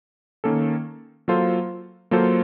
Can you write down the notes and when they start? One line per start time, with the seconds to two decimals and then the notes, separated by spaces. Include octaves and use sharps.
0.44 D#3 A#3 C#4 A4
1.28 F#3 A#3 F4 A4 C5
2.11 F#3 A#3 F4 A4 C5